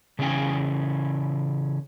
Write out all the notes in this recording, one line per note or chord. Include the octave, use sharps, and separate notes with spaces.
C#3 E3 C#4 G5 G#5